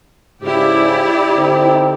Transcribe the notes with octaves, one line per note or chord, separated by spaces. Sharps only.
G#2 C#3 E4 G4 D5
D3 C4 D#4